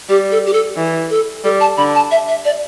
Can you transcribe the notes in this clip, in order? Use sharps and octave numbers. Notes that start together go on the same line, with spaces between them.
G3 G4
A4
G4
A4
E3
A4
G3 A4
A5
D3 B5
A5
E5
E5
D5